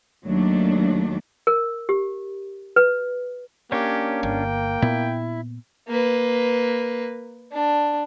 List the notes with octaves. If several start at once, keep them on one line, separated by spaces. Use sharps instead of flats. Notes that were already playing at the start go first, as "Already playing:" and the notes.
D#2 F#3 A3 D4
A#4
G4
B4
A#3 C#4 D4 G4 C#5
G1 G5
A#2 B3 E4
A#3 B4
D4